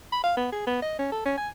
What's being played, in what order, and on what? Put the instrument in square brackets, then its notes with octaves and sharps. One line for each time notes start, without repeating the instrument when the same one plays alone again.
[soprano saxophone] B5
F5
B3
G#4
B3
D#5
C#4
A4
C#4
G#5